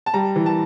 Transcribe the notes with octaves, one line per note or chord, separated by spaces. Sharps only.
A5
G3 A#5
E3
A5